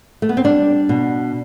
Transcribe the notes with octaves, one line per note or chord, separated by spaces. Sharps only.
A3
B3
C4
G3 D4
B2